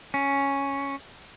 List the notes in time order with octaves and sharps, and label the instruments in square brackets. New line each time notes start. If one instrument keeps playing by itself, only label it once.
[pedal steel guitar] C#4